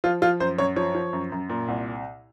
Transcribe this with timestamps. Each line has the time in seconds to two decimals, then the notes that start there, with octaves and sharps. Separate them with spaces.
0.04 F3 F4
0.22 F3 F4
0.40 F#2 C5
0.58 F#2 C#5
0.76 F3 C#5
0.95 F3
1.13 F#2
1.32 F#2
1.49 A#2
1.68 C2